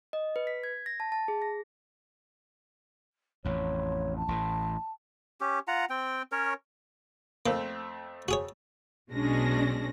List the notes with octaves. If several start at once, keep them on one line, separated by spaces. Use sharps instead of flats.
D#5
B4
B6
G#6
A#6
A5
A5
G#4
A#6
A1 F2 C#5
A5
A1 A2
C#4 G4
F4 F#5 A#5
C4 G5
C#4 A#4 C#5
F2 A3 A#3 C4
F#4 G#4 C#5
B1 B2 G#3 C#4 D4 A#6